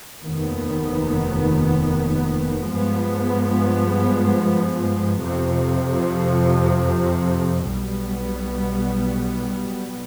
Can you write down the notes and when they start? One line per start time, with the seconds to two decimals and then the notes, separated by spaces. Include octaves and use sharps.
0.22 F1 D#2 D#3 B3
2.72 G2 F3 G#3 B3
5.21 F2 C3 F3
7.70 B1 B2 G3 B3